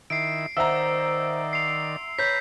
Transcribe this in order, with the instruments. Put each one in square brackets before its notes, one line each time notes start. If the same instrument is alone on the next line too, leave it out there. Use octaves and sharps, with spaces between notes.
[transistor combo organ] D#3 E4 [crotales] C7 D7
[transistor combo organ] D#3 D5 [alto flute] C5 [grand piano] E5 F#5 A#5 [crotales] E6
[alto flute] C6 [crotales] C7 F7
[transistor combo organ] B4 A#5 [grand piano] C#5 [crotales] G6 B6